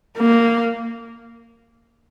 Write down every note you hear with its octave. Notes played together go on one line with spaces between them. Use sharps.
A#3